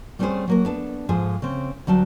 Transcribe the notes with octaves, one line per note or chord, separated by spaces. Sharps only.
G3 A3 C4 C#4 G#4 C5
F#3 A#3 A#4
B3 D4 A4
G#2 F3 G#4 A4 C5
C#3 C4
D2 F#3 G3 A5